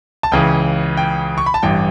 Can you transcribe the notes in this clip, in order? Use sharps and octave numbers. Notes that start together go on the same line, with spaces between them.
A5
C#2 C#3 E3 G5
G5
C#6
B5
A5
A1 G2 E3 G5